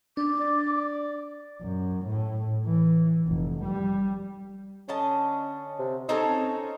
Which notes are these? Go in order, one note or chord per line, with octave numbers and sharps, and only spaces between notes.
D4 D6
D5
F#2
A2
E3
F1
G3
D3 C#4 D#5 A5
C3
C4 C#4 D#4 A4